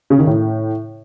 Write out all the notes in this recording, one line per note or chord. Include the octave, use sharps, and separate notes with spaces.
C#3
D#3
A2